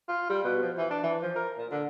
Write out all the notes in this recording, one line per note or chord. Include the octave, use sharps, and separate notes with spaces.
F4
G3
B2
F3
E3
D4
E3
F3
A#4
A#2
D3